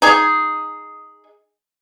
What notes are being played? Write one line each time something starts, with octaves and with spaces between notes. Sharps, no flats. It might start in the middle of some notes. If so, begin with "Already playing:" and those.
D#4 G#4